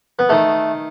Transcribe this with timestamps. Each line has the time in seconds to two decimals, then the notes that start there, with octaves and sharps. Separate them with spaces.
0.19 B3
0.29 D#3 A3